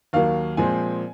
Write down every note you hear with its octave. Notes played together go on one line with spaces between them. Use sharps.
D#2 D#3 F#3 A#3 F5
A#2 F3 G#3 C4 G#5